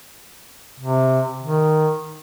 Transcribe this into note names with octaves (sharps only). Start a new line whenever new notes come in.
C3
D#3